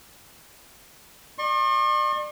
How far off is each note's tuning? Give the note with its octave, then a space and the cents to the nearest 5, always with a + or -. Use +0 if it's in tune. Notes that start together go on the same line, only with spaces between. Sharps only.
D5 +35 C#6 -45